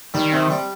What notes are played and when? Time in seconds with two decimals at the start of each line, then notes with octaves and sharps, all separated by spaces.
0.14 D#3 G3
0.33 C3
0.51 G3